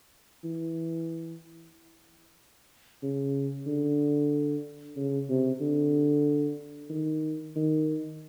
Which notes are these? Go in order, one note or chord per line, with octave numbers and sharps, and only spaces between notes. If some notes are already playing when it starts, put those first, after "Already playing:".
E3
C#3
D3
C#3
C3
D3
D#3
D#3